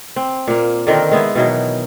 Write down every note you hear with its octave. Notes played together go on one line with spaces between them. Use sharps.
C4
A#2 A#3
D3 D#3 C4 A#4
G#3 B3 E4
B2 D#3 E3 F#3